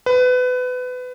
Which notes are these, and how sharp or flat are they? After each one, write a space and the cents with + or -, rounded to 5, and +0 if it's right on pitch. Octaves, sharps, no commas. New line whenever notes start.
B4 +25